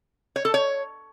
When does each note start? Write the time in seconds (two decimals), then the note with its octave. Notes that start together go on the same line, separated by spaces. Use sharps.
0.36 C#5
0.45 A4
0.54 C#5